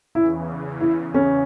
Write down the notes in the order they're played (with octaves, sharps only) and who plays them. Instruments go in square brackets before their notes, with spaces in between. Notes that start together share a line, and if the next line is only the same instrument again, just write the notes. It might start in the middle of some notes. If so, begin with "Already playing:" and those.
[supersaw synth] E2 C#3 E3 [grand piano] E4
[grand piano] E4
C#4